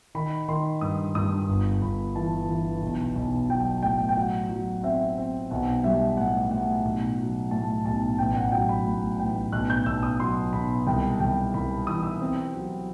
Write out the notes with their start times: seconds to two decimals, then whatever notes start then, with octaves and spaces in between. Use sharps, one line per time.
0.15 D#3 B5
0.48 D#3 C6
0.81 G2 D#6
1.15 G2 D#6
1.49 G1
1.82 G1 B5
2.15 E3 A5
2.49 E3
2.82 B1
3.16 B1
3.50 F#3 G5
3.83 A2 G5
4.09 G5
4.16 F#3 F#5
4.50 F#3
4.83 C4 E5
5.18 C4
5.50 B1 F#5
5.84 G3 E5
6.17 A2 F#5
6.51 A2 F#5
6.85 B1
7.18 F#3
7.51 A2 A5
7.85 B1 A5
8.18 A1 G5
8.35 F#5
8.52 F#3 G5
8.69 B5
8.86 A2
9.19 A1 G5
9.52 B1 F#6
9.70 G6
9.86 B1 E6
10.03 D#6
10.20 F#3 C6
10.53 B1 B5
10.87 C2 G5
11.20 C2 G5
11.54 C2 B5
11.87 E3 D#6
12.03 E6
12.21 C4
12.54 F#3